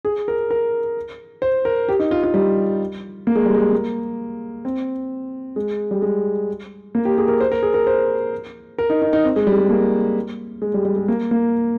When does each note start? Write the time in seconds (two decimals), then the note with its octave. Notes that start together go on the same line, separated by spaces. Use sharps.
0.05 G#4
0.28 A#4
0.51 A#4
1.42 C5
1.65 A#4
1.89 G4
1.99 D#4
2.11 F4
2.23 F4
2.34 G3
3.27 A#3
3.36 G#3
3.46 G3
3.54 G#3
3.72 A#3
4.65 C4
5.56 G#3
5.91 G3
6.02 G#3
6.95 A#3
7.05 G4
7.18 G#4
7.28 A#4
7.41 C5
7.52 A#4
7.63 G#4
7.74 A#4
7.87 C5
8.78 A#4
8.90 D#4
9.02 D#4
9.13 D#4
9.25 C4
9.36 G#3
9.47 G3
9.58 G#3
9.69 A#3
10.62 G#3
10.74 G3
10.85 G3
10.96 G#3
11.08 A#3
11.31 A#3